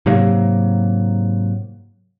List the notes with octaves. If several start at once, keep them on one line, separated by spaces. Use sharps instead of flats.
G#2 C3 F#3 A#3